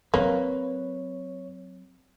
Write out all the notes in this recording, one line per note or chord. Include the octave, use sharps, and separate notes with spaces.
F#3 A#3 C4 B4 C#5